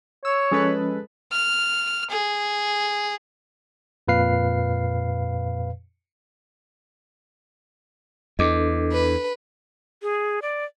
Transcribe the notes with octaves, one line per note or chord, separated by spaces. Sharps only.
C#5 E6
F3 G#3 C#4 A4 B4
F6
G#4
F2 A#2 B4 F5 C7
E2 D4 A4 D#5 D6
B4
G#4
D5